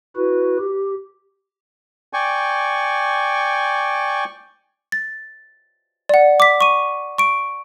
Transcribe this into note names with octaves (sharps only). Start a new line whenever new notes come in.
E4 F#4 B4
G4
D5 G5 G#5 C#6
A6
D5 F#5
D6 B6
C#6 D#7
C#6 D7